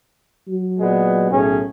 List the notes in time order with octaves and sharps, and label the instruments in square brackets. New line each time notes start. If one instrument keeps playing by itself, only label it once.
[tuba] F#3
[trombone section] A#2 G#3 B3
[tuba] B1 [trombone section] A2 C#4 G#4